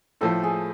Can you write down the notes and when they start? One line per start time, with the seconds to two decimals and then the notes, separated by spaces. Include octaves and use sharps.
0.21 A2 F3 A3 A4
0.43 G#4